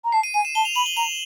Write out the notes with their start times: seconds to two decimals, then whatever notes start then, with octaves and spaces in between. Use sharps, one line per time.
0.05 A#5
0.12 A5 C7
0.23 D#7
0.34 G#5 D#7
0.45 E7
0.55 A5 G7
0.65 F7
0.75 B5 F#7
0.86 G7
0.97 A#5 F7